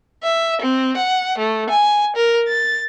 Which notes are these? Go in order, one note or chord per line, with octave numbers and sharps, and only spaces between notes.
E5
C4
F#5
A3
G#5
A#4
A6